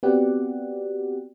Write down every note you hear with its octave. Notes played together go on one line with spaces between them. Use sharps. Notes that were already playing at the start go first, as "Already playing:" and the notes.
B3 C4 F#4 G4 D5 F#5